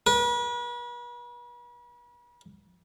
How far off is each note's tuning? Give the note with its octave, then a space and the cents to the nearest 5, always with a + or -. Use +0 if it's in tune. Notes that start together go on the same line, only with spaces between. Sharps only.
B4 -40